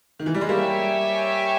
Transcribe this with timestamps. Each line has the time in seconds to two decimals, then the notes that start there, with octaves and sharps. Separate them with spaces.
0.19 D#3
0.26 E3
0.34 G3
0.41 G#3
0.48 G3 A#3 G4 C#5 E5 G#5